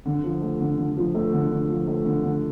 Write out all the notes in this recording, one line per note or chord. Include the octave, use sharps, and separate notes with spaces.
D3
F3
A3
D3
D3
F3
A3
D3
D3
F3
A3
D3
D3